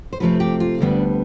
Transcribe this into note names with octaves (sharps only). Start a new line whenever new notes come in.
C5
C3 F3 A3 C4 B4
G4
F4
D2 D3 G3 B3 D4